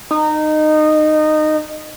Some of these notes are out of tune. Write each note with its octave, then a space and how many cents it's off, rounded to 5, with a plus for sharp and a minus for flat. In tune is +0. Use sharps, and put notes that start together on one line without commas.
D#4 -20